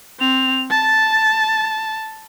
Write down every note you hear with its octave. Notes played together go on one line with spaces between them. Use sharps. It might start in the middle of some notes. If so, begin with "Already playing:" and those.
C4 F7
A5 A6